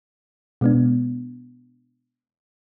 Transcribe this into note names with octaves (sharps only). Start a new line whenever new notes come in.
B2 G#3 B3 D4